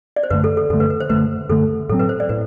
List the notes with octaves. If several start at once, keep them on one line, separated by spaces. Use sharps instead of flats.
D5
C5
F#2 D3 A3 B4
A4
A4
F#2 D3 A3 A4
B4
B4
C5
F#2 D3 A3 B4
F#2 D3 A3 A4
A2 F#3 C4 A4
B4
C5
D5
A2 B4